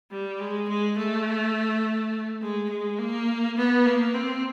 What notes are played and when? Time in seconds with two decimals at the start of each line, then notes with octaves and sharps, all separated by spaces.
0.11 G3
0.40 G#3
0.69 G#3
0.98 A3
2.42 G#3
2.70 G#3
2.99 A#3
3.57 B3
3.86 A#3
4.14 C4